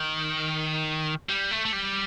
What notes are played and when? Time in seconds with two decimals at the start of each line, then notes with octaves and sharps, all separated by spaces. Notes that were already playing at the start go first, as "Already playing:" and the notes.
Already playing: D#3
1.29 G3
1.51 A3
1.65 A3
1.73 G3